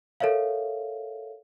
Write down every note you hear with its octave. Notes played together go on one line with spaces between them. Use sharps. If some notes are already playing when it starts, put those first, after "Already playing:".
A4 A#4 C#5 E5 F5